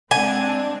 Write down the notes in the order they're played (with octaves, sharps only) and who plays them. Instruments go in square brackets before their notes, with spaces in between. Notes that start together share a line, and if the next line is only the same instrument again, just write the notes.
[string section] G#3 C4 D4 [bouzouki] G#5